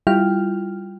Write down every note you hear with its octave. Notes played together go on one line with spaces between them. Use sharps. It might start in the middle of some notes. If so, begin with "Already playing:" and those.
G3 E4 F4 G5 F6